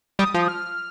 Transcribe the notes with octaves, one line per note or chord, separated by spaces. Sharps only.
G3 D#6
F3
F6